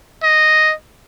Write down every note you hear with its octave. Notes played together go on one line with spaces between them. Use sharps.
D#5